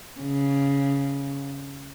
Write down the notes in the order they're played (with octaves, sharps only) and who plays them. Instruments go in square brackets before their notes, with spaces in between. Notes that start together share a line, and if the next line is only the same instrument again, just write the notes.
[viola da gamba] C#3